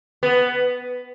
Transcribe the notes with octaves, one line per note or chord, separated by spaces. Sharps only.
B3